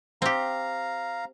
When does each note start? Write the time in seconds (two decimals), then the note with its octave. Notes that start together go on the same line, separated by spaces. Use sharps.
0.22 C4 G4 F5 A#5